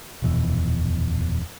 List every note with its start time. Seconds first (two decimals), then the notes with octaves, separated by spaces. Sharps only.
0.22 D#1 F2 B2 E3